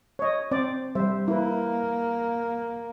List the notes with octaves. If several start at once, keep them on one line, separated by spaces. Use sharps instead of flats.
C#5 D#5
C4 C5 D5
G3 C5 E5
A#3 E4 B4